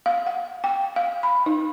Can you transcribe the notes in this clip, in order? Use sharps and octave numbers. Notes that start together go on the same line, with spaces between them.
F5
F#5
G5
F5
B5
D#4